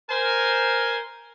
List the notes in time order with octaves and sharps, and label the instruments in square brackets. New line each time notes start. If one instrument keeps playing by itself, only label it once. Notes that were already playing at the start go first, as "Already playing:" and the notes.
[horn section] A#4 C5 G#5